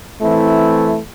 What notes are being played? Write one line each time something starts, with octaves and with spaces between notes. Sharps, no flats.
E3 A3 C4 E4